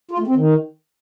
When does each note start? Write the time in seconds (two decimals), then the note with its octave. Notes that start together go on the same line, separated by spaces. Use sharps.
0.11 F4
0.19 A3
0.27 C4
0.35 D#3